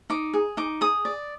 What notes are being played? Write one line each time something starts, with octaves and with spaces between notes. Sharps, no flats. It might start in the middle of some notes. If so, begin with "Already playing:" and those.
D#4 D6
G#4
D#4 D6
G#4 D#6
D5